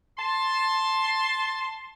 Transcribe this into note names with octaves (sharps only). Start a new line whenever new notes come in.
A5 C6